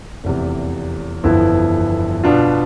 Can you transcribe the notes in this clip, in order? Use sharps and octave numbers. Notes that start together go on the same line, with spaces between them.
F1 E2 C3
G1 F2 E3 B3 E4
B2 B3 D4 F4